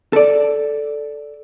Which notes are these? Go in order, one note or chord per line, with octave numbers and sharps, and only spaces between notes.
A4 D5